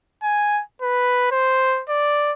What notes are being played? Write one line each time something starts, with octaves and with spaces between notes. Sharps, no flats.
G#5
B4
C5
D5